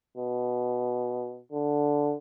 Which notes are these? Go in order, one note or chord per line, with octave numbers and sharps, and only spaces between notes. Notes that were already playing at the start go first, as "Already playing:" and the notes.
B2
D3